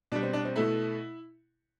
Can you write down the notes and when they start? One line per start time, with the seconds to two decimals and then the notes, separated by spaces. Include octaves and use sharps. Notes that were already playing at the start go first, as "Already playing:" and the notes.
0.12 B2 D4
0.15 G3
0.23 C4
0.33 D4
0.45 C4
0.56 B2 A3 E4